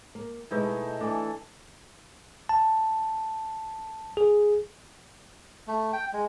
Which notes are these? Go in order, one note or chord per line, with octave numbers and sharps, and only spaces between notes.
A#3
B2 G#3 A3 D#4 E4 B4
E3 A3 D4
A5
G#4
A3
G5
G#3